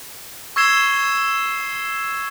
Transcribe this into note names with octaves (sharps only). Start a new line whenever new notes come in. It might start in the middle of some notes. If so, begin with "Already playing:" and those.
C#6 E6 G#6 C7 E7 G7